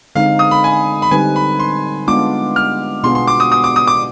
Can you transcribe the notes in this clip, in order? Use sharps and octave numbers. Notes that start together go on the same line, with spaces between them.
D3 G#3 C4 D#4 F5
D#6
B5
G#5
B5
D3 G3 C4 D#4 B4 G#5
B5
C6
G#3 B3 D4 F4 D6
F6
B2 B3 D4 F4 G#4 C6
C6
D6
D#6
D#6
D6
D#6
D6